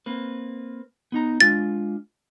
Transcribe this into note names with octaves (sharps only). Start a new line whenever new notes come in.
A#3 C4 B4
B3 D#4 A#5
G#3 D4 F4 A6